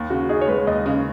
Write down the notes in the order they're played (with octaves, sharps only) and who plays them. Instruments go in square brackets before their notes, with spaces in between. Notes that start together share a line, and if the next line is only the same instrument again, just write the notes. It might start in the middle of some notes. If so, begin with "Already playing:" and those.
Already playing: [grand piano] D#2
[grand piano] C#3 [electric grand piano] F#4
[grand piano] D#4 [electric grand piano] G#4
[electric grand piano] C#5
[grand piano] G#3 [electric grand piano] B4
[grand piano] D#2 [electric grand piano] D#5
[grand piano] C#3